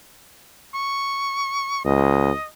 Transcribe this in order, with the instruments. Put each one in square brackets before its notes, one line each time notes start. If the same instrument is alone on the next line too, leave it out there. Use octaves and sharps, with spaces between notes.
[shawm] C#6
[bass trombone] C#2 [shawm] D#5